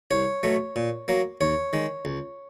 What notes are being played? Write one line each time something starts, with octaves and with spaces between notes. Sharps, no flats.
C2 C#5
B2 F#3 A3
A#2
F#3 A#3
D#2 C#5
D#3 G#3
C#2